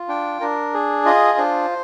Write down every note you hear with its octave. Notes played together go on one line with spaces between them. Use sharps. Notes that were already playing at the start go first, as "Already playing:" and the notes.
Already playing: F4
D4 G5
D4 A#4
G#4
F4 D#5
D4 C5